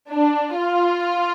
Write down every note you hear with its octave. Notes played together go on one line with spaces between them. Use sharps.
D4
F4